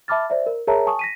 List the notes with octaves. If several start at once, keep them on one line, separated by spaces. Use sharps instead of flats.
E5 A5 B5 D6 F6 A6
C5 D5 E5
A#4
G#4 A#4 C#5 E5 A5 A#5
G#5 A5 C#6 D#6
A#6 B6 D#7